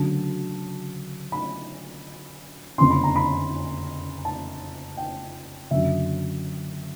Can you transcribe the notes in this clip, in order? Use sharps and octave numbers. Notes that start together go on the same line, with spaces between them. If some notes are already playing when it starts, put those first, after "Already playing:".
Already playing: D2 C#3 F#3 A5
B5
F#1 F2 D3 C6
B5
A#5
B5
A5
G5
F#1 F#2 D3 F#3 E5